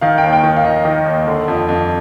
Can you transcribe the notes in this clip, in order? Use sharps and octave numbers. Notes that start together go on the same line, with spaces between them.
D#3 F5
G5
D#2
G5
D#3
F5
D#3 D#5
D#3
D#2
D3
F2
F2